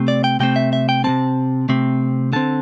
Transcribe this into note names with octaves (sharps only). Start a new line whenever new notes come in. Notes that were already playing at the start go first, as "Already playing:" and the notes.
Already playing: C3 A3 C4
D5
G5
C3 A3 C4 G5
E5
E5
G5
C3 A3 C4 A5
C3 A3 C4
D3 C4 A5